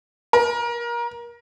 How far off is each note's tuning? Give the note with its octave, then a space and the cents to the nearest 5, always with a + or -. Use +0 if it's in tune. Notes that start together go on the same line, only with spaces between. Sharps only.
A#4 +25